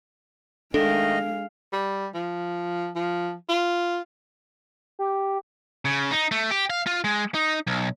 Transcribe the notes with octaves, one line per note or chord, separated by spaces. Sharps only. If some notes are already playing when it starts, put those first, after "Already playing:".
D#3 G#3 A3 D4 A4 D#5 F5
G3
F3
F3
F4
G4
C#3
D#4
A3
G4
F5
F4
G#3
D#4
B1